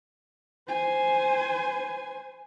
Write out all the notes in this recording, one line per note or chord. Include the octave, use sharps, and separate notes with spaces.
C5 G#5